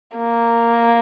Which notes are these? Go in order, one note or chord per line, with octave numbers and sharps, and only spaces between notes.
A#3